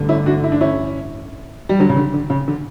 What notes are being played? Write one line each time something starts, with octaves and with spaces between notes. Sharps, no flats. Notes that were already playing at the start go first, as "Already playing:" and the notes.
Already playing: A1 G2 D3
C#4 E4
D4 F#4
E4
D4
C#4 E4
G3
D3 F#3
C#3
D3
D3
C#3
D3